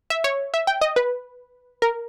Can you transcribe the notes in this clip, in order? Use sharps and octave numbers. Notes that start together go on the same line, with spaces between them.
E5
C#5
E5
G5
D#5
B4
A#4